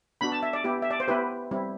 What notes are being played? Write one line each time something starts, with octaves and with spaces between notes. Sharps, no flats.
B3 D4 F#4 B5
A5
E5
D5
B3 E4 G4
E5
D5
C5
B3 E4 G4 B4
G3 C4 E4